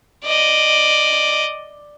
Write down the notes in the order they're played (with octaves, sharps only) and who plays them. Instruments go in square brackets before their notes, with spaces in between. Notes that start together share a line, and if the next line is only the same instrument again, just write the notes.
[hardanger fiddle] D5 D#5